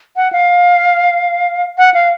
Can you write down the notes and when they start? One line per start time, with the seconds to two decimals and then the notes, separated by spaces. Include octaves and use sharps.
0.16 F#5
0.33 F5
1.78 F#5
1.94 F5